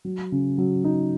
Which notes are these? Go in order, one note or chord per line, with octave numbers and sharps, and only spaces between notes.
F#3
C#3
F#3
D#4